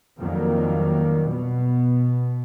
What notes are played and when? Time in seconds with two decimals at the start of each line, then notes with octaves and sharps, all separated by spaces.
0.21 F2 D#3 F#3 G3 A#3
1.29 B2 B3